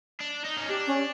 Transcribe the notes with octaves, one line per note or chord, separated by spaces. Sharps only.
D4
D#4
C#4
D4 G4
C#4